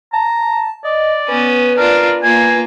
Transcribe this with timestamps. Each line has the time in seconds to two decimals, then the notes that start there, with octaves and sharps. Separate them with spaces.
0.13 A5 A#5
0.84 D5 D#5
1.28 B3 C#4 B4
1.78 D4 F4 A#4
2.23 A#3 F4 G#5